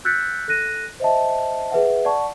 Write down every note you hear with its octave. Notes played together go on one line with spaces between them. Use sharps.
E6 F#6 G6 A6 B6 C#7
A4 F#6 A#6 D#7
C5 D#5 E5 A5
G#4 B4 E5 F#5
D5 F#5 A5 C#6